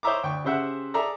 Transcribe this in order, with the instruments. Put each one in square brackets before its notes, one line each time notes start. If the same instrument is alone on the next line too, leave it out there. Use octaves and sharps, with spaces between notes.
[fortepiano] C5 C#5 D#5 E5 A#5 D6
D2 G5 C#6
C#3 G4 C5 E5 F#5
G#4 A4 D5 E5 A#5